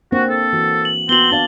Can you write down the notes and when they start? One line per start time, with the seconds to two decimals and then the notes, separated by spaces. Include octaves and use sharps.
0.12 A#3 C4 D4 F#4
0.29 A4
0.53 E3 F#4
0.85 F#7
1.09 B3 C4 F#4 F#7 G7
1.31 D4 D5 F5 A5